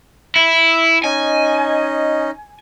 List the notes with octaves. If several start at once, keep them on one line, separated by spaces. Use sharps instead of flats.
E4
C#4 D#4 D#5 G#5